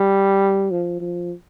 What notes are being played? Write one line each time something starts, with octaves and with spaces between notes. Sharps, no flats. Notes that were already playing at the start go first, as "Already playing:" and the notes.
Already playing: G3
F3
F3